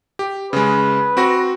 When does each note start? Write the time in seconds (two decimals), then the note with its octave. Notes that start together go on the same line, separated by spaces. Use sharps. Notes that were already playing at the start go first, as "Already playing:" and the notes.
0.19 G4
0.53 C#3 G#3 B4
1.17 C4 F#4 A#6